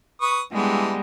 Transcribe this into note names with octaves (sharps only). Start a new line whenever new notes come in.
B4 C#6 D#6
D3 E3 G3 G#3 B3